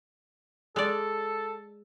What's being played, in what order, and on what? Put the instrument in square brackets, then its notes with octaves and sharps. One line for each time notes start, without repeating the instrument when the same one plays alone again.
[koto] G#3 D5 [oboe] A4